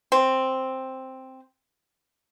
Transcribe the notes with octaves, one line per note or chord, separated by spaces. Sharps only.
C4